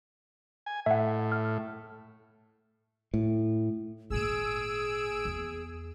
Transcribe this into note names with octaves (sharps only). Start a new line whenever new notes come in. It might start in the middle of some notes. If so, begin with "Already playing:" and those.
G#5
A2 E5 F#5
F6
A2
G#1 A#2 G#4 E6 D7
E2 B3